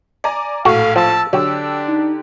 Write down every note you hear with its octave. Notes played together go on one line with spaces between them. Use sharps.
D5 G#5 A#5
A#1 A2 F#4 A4 F5
F3 A5 E6
D3 F#3 D4 G4 E6
D#4